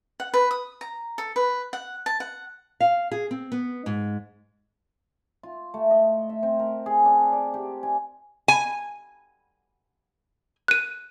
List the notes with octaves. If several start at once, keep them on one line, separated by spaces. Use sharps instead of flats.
F#5
B4
D#6
A#5
A4
B4
F#5
A5
F#5
F5
G#4
C4
B3
G#2
F4
A3
D#5
E5
C4
A#4
G#4
D4
D5
G4
G#5
G#5
F#6 D#7